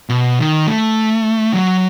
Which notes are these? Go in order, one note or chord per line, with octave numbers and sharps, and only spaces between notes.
B2
D#3
A3
F#3